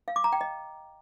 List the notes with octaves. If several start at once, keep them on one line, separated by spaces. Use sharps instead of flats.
F5
D6
A#5
G5
D#5